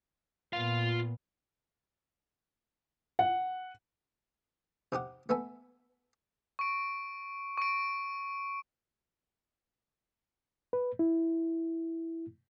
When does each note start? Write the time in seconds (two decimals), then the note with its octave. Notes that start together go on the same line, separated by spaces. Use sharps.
0.53 A#2 B3 F4 F5
3.19 F#5
4.92 C3 D#4 G4 F#5
5.29 A3 B3 E5 G#5
6.59 C#6 D7
7.58 C#6 D7
10.73 B4
10.99 E4